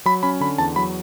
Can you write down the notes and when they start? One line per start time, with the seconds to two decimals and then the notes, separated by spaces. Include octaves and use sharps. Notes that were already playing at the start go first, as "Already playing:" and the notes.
0.06 F#3 B5
0.23 C#4 B5
0.40 D3 B5
0.58 E2 A5
0.76 F#3 B5